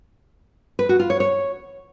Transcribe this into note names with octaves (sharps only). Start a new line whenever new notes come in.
B4
F#4
F4
C#5
C#5